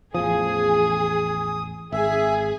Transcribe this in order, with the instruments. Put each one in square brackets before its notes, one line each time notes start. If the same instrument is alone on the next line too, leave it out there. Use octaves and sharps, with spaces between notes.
[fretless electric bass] A1 E2 F3 [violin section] G#4 [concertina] D#6
[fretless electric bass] G#1 [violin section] G#4 [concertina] E5